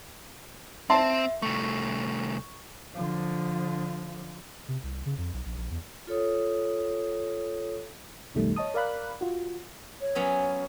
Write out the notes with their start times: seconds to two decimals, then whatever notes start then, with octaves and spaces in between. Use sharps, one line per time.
0.90 C4 E5 A5 C6
1.42 C2 A3 C#6
2.95 D3 F3
4.68 C3
4.83 C2
5.06 C#3
5.18 F2
5.33 B1
5.46 A#1
5.57 A#1
5.71 E2
6.07 F4 A4 C#5 D#6
8.35 B1 F2 B2 D#3 G3 A3
8.56 C#5 D#5 A5 D#6
8.74 A#4 D5 F5 B5 F#6
9.21 F4 F#4
10.01 C#5
10.15 F#3 B3 C#4